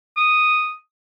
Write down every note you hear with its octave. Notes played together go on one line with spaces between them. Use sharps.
D#6